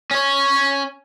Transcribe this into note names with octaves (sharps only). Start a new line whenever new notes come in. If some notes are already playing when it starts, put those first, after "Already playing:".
C#4 C#5